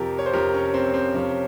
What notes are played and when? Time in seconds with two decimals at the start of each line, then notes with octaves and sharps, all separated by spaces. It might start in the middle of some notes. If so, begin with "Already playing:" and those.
Already playing: F2 C3 F3 G4 A#4
0.19 C#5
0.26 C5
0.33 F2 C3 F3 G4 A#4
0.54 C#4
0.74 C4
0.94 C4
1.14 F2 C3 F3 C#4